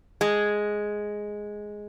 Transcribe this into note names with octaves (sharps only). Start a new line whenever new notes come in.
G#3